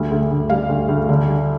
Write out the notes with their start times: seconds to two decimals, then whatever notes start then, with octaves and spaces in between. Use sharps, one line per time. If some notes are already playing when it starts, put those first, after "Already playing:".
Already playing: D2 G3
0.11 D2
0.31 D2
0.50 G3 F5
0.69 D2
0.89 D2
1.09 D3
1.28 G3